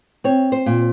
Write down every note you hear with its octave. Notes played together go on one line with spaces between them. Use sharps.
C4 C#5
C5
A#2